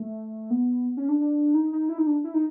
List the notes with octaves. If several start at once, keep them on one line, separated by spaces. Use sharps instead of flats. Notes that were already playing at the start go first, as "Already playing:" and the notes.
Already playing: A3
B3
C#4
D4
D4
D#4
D#4
E4
D#4
D4
E4
D#4